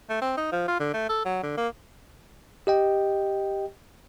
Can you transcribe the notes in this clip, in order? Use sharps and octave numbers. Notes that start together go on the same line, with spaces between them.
A3
C4
D#4
F3
F4
D3
A3
A4
F#3
D3
A#3
G4 D#5 G5